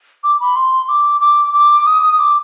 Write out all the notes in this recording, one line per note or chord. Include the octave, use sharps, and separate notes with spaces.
D6
B5
C6
D6
D6
D6
D#6
D6